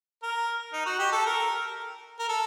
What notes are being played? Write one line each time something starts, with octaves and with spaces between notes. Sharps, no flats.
A#4
D#4
F#4
G4
A4
A#4
A#4
A4